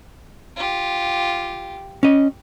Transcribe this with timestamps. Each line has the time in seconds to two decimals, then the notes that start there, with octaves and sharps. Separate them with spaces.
0.56 F4 G4
2.03 C#4 D#5